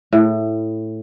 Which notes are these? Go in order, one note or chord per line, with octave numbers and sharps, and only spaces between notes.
A2